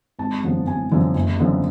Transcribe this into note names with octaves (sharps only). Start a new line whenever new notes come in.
G#1 A5
F#2 D3 F3 B3
G#1 G#5
F#2 D3 F3 B3
F#1
F#2 D3 F3 B3